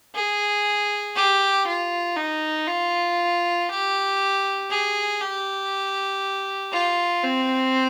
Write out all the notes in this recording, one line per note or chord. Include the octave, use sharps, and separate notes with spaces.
G#4
G4
F4
D#4
F4
G4
G#4
G4
F4
C4